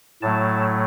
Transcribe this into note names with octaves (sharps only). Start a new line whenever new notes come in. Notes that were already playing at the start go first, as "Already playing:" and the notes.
A2 F#3 A3 A5